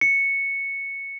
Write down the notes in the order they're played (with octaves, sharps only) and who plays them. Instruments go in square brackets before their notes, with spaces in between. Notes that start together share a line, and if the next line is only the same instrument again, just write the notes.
[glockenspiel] C#7